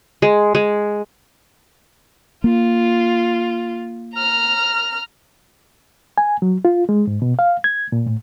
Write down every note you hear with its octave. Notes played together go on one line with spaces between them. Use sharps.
G#3
G#3
A#3 F4
A#5 F6
G#5
F#3
F4
G#3
G#2
B2
F5
G#6
A#2
A2